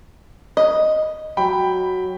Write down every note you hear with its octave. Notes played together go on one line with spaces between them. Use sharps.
D#5
F#3 G5 B5